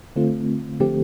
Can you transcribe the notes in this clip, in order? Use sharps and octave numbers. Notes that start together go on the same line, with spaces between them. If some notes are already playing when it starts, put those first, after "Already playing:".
D3 A3 C4 F4
D3 F3 A3 C4 G4